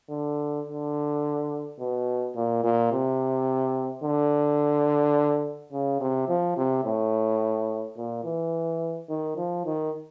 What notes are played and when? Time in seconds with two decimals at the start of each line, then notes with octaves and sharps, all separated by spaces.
0.10 D3
0.67 D3
1.79 B2
2.36 A#2
2.64 A#2
2.92 C3
4.04 D3
5.72 C#3
6.01 C3
6.28 F3
6.57 C3
6.85 A2
7.97 A#2
8.24 E3
9.09 D#3
9.37 F3
9.66 D#3